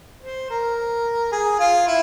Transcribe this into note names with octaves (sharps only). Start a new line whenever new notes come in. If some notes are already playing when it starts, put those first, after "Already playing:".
C5
A#4
G#4
F4
E4